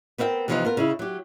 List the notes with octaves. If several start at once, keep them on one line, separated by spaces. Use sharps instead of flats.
B3 C4 A#4 F5 G5
C3 E3 F3 B3 C4 D#4
B3 F4 A#4
C#3 D#4 E4
F#3 G4